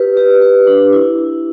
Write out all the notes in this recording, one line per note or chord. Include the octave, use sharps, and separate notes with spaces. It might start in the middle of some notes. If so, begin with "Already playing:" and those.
Already playing: G4 B4
G4 B4
G4 B4
D4 G4
E4